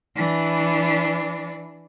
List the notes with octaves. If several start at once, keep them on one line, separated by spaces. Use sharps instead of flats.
E3 D4